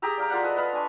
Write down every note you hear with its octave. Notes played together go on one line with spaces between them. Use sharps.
G4 G#4 A#5 E6
D5 F5 A#5
F4 A#4 F#5
A4 B4 D#5 A5
B4 D#5 F5 B5
D4 G#5 C#6